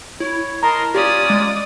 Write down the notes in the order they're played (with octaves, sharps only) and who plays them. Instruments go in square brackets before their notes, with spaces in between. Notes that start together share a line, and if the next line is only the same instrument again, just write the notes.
[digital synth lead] E4 [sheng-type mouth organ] C#5
[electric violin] A#4 [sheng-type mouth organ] D#5 A5 C6 [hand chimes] A#5
[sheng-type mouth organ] C#4 F4 C#5 [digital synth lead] G4 [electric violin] D5 D#6
[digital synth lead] G#3